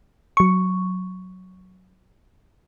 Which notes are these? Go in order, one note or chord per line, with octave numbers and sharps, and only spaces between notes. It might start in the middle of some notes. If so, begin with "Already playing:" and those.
F#3 C#6